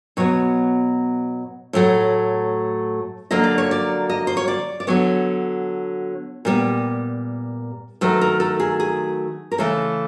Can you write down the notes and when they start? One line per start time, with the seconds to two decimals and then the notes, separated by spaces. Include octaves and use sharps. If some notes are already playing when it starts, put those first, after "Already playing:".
0.17 B2 F#3 B3 C#5
1.73 A2 F#3 A3
3.31 D3 F#3 A#3 D#5
3.44 D5
3.58 C#5
3.71 D5
4.10 D#5
4.27 C5
4.37 C#5
4.48 D5
4.80 D5
4.87 D3 F#3 B3 C#5
6.45 A#2 G3 B3
8.01 D#3 F#3 A3 B4
8.21 A#4
8.40 A4
8.60 G#4
8.80 G#4
9.51 A#4
9.58 C#3 E3 A3 A4